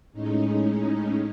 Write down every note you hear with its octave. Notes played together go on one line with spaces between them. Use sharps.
A2 G#3 C#4 D#4